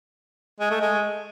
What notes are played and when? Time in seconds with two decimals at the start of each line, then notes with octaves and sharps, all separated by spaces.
0.60 G#3
0.70 A3
0.81 G#3